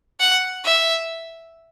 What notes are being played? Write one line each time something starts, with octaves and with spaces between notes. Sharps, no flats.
F#5
E5